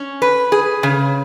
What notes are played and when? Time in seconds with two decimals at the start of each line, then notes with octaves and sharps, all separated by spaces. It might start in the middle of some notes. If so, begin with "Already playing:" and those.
Already playing: C#4
0.22 B4
0.52 G#4
0.83 C#3